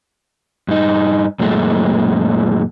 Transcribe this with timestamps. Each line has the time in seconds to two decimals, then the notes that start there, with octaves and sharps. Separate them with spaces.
0.68 G2 D#4
1.40 F#2 A#2 G#3 A3